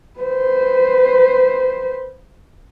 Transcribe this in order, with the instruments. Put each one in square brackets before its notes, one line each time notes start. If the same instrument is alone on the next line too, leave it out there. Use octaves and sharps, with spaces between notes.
[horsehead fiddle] B4 C5